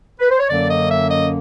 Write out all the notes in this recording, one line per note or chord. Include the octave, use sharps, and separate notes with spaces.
B4
C5
C#5
F#2 D3 F#3 A#3 C#4 D5
D#5
E5
D#5